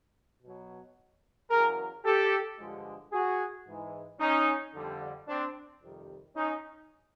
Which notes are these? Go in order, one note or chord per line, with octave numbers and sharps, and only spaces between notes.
B2 F#3
E2 C#3 F#3 G#4 A#4
G4 A4
G2 D3 F3 G#3
F#4 G#4
G#2 E3 G#3
C#4 D#4
F2 D3 G3
C4 D4
F2 C3 D#3 G3
C#4 D#4